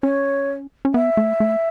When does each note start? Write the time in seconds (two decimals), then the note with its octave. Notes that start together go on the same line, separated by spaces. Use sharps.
0.03 C#4 C#5
0.85 C#4
0.94 B3 E5
1.17 A3
1.40 A3